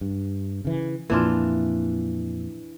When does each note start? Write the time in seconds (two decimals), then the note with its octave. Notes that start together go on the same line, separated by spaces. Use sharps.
0.01 G2
0.65 C#3 E3
1.10 F2 A#2 E3 A#3 D4 F4